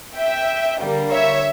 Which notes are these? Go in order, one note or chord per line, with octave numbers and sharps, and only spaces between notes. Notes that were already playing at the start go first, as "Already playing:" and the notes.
E5 G5
D3 G3 A#3
C#5 E5